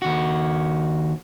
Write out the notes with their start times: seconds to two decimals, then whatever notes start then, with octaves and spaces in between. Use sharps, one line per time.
0.02 D#2 F#4